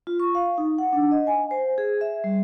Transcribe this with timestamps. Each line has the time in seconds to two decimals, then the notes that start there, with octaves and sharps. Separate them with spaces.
0.07 F4
0.20 C#6
0.35 F5
0.58 D#4
0.78 F#5
0.93 D4
1.11 D#5
1.27 G#5
1.51 C5
1.78 G#4
2.01 E5
2.24 G3